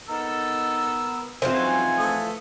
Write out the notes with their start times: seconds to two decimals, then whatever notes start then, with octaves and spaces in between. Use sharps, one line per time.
0.09 B3 D#4 A4 A#4 E6
1.42 E3 F3 C4 F4 C5
1.55 G#2 F#3 C#4 F#5 G#5
1.98 A3 A4 D#6